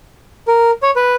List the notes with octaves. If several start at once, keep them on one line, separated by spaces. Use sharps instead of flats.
A#4
C#5
B4